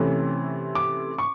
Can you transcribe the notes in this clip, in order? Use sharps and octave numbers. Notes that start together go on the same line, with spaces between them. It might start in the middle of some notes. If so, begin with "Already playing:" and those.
Already playing: C3 E3 A3 C#4
D6
C#6